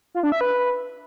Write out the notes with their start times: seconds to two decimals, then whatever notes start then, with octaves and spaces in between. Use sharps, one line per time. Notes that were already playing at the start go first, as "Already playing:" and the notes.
0.15 F4
0.23 D4
0.32 E5
0.41 B4